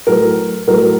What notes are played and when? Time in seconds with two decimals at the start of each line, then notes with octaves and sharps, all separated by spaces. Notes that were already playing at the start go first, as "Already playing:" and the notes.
0.07 A2 F#3 A3 A#4
0.67 A2 F#3 A3 A#4